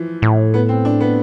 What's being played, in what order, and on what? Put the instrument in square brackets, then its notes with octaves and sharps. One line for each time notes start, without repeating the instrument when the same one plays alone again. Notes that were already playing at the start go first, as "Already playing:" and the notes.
Already playing: [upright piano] E3 F3
[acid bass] A2
[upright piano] B3
C4
D4
B3